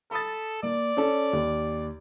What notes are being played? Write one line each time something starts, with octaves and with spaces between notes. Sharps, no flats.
A4 B5 D#6 A6
A#3 D5
C#4 A4
D#2